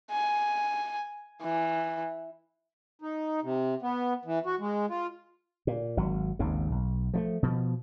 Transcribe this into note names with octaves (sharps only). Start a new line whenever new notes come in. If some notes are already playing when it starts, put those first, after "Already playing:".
G#5
E3
D#4
C3
B3
E3
F#4
G#3
F4
A#2
G#1 F#3
G#1 D#2 C#3
B1
F3 G#3 A3
B2 F3